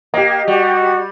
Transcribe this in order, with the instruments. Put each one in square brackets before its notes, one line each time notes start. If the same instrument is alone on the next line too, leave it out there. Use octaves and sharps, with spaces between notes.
[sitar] A#3 [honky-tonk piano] G4 D#5
[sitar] G3 [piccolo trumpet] F#4